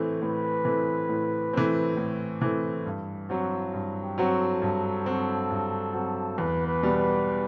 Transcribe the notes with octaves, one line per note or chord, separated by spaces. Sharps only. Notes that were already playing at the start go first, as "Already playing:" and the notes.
Already playing: A2 E3 A3 C4
A2 B4
E3 A3 C4
A2
E3 A3 C4
A2
E3 A3 C4
G2
F#3 C4 F#4
G2
G4
F#3 C4 F#4
A4
G2
F#3 C4 F#4
G2
F#3 C4 F#4
E2 B4
B4
B2 G3 B3
B4